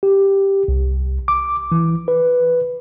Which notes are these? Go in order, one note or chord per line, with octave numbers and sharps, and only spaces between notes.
G4
C2
D6
E3
B4